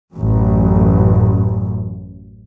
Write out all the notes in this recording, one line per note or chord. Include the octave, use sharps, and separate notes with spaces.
A1 F#2